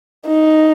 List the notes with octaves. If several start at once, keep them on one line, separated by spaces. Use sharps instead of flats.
D#4